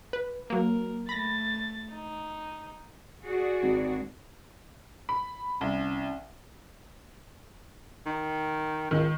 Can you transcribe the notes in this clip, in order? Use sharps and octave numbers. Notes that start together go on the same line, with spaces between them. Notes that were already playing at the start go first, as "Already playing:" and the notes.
B4
F#3 A#3 A#4
A3 B5 A6 A#6
D#4
F#4 G#4 D5
G#1
B5
C2 C#4
D#3
C#2 D#3